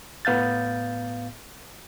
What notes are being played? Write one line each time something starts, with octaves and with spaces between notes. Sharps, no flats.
A2 B3 F5 G6 A6